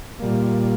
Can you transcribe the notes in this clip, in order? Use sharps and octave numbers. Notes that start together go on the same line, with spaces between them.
A#2 G3 A#3